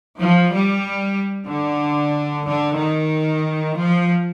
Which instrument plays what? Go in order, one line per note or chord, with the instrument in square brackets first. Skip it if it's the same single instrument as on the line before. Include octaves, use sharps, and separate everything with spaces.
[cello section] F3
G3
D3
D3
D#3
F3